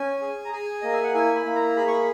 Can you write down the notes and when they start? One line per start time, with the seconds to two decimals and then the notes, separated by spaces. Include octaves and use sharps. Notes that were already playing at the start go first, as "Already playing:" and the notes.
Already playing: C#4 G#5
0.21 G#4
0.45 A#5
0.53 G#4 G#5
0.82 A#3 D#5
0.93 E5
1.03 F#5
1.14 E4 G#5
1.35 B5
1.45 A#3
1.56 A#5
1.76 G#4 B5
1.88 C#6
1.92 B5